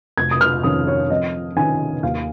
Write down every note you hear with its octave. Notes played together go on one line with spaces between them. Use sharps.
F1 G#6
D#6
F6
F2 D#3 C#4 F4 D#6
C#5
F2 D#5
D#3 C#4 G#5
D#2 F5